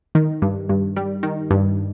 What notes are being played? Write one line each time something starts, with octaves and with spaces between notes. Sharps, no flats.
D#3
G2
G2
G3
D#3
G2